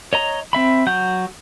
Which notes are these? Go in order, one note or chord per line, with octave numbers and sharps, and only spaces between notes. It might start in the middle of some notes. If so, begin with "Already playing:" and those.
C#5 D#5 A#5
C4 E5 B5
F#3 F#5 G6